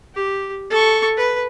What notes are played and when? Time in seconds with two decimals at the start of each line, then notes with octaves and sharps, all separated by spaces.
0.15 G4
0.70 A4 C#6
1.17 B4